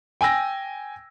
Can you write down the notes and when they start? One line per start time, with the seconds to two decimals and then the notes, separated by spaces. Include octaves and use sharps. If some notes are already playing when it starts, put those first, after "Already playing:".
0.21 G5 G#5 E6 A#6